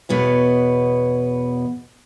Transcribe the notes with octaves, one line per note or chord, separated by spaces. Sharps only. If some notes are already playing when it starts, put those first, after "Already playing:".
E2 B2 B3 C#5